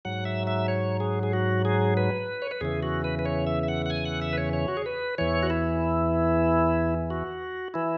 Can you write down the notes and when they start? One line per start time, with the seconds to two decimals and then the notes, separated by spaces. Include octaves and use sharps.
0.05 G#2 F#3 F#5
0.25 E5
0.47 E5
0.68 C#5
1.00 G#4
1.23 G#4
1.33 F#4
1.65 G#4
1.97 B4
2.42 C#5
2.51 B4
2.61 E2 C#3 E3 G#4
2.83 F#4
3.04 B4
3.19 B4
3.26 C#5
3.47 E5
3.63 E5
3.68 F#5
3.86 F#5
3.90 G#5
4.05 F#5
4.22 E5
4.33 B4
4.38 C#5
4.53 C#5
4.68 F#4
4.77 G#4
4.86 B4
5.18 E2 E3 C#5
5.43 F#4
5.50 E4
7.10 F#4
7.74 E3 E4